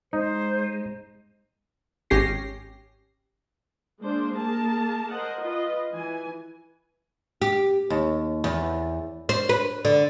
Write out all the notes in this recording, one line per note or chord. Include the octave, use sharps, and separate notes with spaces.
G#3 D#4 C5
G#1 C#4 G4 A#6 C7
G#3 A#3 D4 C5
A#3 G#4 A#4 A5
A#4 C5 D#5 F#5
F4 B4 D#5
E3 G#5
G4
D#2
E2
C5
B4
D3